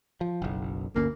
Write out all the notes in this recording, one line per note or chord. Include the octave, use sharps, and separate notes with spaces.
F3
F#1 B1
G1 D2 A#3 C#4